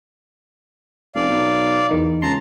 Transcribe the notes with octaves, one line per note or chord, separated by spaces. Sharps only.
F1 D5 F5
B1
E2 D#3 D#4
C#2 A5 A#5 C6